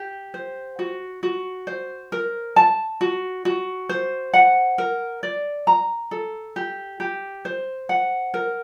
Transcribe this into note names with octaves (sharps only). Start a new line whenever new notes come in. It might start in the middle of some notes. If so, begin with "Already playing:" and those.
Already playing: G4
C5
F#4
F#4
C5
A#4
A5
F#4
F#4
C5
F#5
A#4
D5
A#5
A4
G4
G4
C5
F#5
A#4